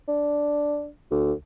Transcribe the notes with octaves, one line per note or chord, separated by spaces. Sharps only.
D4
D2